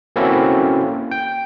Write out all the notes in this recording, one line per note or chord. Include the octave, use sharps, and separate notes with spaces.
A#3 C4 C#4 E4 F#4 A4
G5